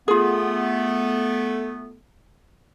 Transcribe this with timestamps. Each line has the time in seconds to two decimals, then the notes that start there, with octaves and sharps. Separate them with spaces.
0.08 A3 B3 F4 G#4